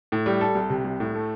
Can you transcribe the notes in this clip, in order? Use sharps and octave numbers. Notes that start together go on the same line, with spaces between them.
A2
G3
A4
C2
C3
C2
A2
A3